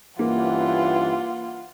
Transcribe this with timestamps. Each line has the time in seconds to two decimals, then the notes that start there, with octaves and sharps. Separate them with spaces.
0.19 G2 E3 A#3 C#4 F4 F#5